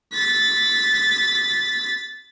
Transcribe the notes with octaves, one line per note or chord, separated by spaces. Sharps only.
A6 B6